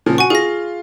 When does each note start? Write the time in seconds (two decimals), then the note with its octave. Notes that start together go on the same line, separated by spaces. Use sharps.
0.06 A#2 C#3 F3
0.18 F#4 G#5 C#6
0.30 F4 G#4 A#6